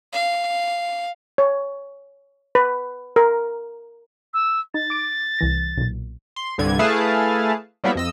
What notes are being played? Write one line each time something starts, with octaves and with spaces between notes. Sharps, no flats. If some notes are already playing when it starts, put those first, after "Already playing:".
F5
C#5
B4
A#4
E6
D#4 A6
D6 D7
C2 E3 A#6
B1 A#2
C6
C2 G2 D3 G#6
A3 E4 G#4 B4 F5 A5
F#3 G3 A#3 B3 E4 E5
F2 D#5 E6